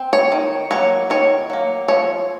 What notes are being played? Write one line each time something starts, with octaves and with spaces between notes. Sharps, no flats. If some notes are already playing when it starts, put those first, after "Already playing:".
Already playing: C4
C#5
D#3
F#3 A#3 C#5
D#3 C#5
F#3 A#3
F3 C#5